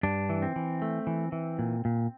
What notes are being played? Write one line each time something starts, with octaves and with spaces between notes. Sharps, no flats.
G2 D4
E3
C4
E3
A3
E3
E3
A#2
A#2